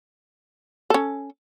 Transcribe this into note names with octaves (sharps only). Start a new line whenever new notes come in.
C#4 A4